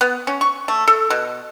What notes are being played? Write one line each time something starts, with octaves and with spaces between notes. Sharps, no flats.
B3
C#4
C#6
A3
A4
B2